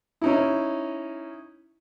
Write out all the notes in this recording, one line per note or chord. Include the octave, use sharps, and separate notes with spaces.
C#4 D#4 E4